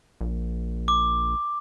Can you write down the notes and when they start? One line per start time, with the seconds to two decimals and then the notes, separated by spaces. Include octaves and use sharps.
0.21 A#1
0.88 D6